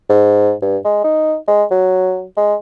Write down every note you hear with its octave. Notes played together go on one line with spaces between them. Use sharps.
G#2
G2
G#3
D#4
G#3
F#3
G#3